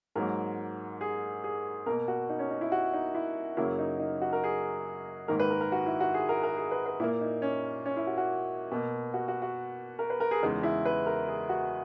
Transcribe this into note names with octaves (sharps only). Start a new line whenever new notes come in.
G#2 F#3 A#3 A#4
G#4
G#4
B2 A#3 A#4
F#4
D#4
C#4
D#4
E4
F#4
D#4
E4
F#2 C#3 F#3 A#3 E4
D#4
D#4
F#4
A#4
G#4
G#2 D#3 A#3 A#4
B4
A#4
A#4
F#4
E4
F#4
G#4
A#4
A#4
G#4
B4
B4
A#2 A#3 E4
D#4
C#4
C#4
E4
F#4
F#4
B2 A#3
F#4
F#4
F#4
A#4
B4
A#4
G#4
E2 C#3 G#3 D#4
E4
B4
A#4
G#4
F#4